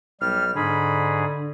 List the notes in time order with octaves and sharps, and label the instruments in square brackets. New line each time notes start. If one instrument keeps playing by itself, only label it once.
[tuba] B1 [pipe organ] G3 [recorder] F6
[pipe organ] G#2 G#4 [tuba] D3 [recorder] B5